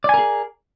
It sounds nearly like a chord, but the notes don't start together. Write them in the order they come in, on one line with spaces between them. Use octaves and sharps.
D5 G#5 A#4 G#4